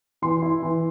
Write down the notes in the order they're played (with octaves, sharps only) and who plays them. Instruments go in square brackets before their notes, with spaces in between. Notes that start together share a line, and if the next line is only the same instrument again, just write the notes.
[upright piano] E3 C6
E4
E3